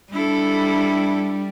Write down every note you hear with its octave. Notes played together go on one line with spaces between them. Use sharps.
G3 D4 E4 A4